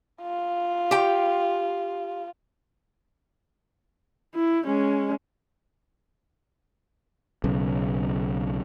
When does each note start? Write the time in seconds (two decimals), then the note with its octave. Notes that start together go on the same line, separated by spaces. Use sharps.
0.22 F4
0.91 G4 G5
4.35 E4
4.67 G#3 C#4
7.44 B1 C#3